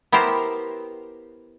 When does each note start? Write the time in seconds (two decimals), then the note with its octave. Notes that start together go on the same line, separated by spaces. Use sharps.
0.12 B3 E4 G4 A#4 C5